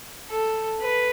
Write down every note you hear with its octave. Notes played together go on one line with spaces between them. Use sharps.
A4
B4